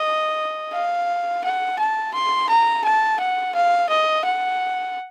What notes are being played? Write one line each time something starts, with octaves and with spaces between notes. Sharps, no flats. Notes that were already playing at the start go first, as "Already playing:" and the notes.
Already playing: D#5
F5
F#5
A5
C6
A#5
A5
F#5
F5
D#5
F#5